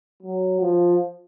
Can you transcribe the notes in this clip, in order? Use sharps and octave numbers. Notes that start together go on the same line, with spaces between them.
F#3
F3